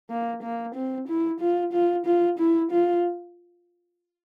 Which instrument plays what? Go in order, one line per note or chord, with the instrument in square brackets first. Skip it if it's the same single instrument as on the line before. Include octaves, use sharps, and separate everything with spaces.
[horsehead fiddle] A#3
A#3
C4
E4
F4
F4
F4
E4
F4